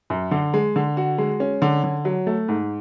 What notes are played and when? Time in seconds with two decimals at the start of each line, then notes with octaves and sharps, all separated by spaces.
0.10 F#2
0.31 D3
0.54 G#3
0.76 D3
0.97 F#4
1.18 G#3
1.40 C#4
1.62 D3
1.84 D3
2.05 F#3
2.27 A3
2.48 G#2